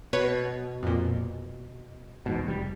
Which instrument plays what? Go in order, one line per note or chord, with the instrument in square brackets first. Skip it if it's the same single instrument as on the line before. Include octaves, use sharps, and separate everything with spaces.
[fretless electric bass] B2 [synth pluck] B4 C#5
[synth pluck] F2 A#2
[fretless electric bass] E2 G#2 B2
F1 G3